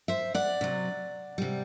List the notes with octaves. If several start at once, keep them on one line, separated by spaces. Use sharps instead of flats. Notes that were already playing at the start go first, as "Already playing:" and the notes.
C5 E5
D5 F#5
C3 F#3
C3 G3